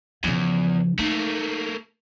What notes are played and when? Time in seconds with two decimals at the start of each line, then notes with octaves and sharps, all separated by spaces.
0.24 E2 C#3 F3
0.99 A3 A#3 D#4